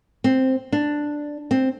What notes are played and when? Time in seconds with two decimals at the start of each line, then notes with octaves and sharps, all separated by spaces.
0.24 C4
0.72 D4
1.51 C4